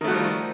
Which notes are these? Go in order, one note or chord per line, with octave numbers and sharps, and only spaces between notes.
D#3 F3 G3 A3 F#4